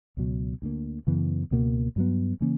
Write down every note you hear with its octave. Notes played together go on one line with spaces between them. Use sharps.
C#2 B2 F#3
D2 D3 A#3
F#2 C#3 E3 B3
C#2 B2 A#3
G2 F#3 B3
C#3 E3 A#3 C#4